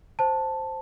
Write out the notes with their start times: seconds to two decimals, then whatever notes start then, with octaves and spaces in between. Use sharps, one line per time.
0.19 C5 A5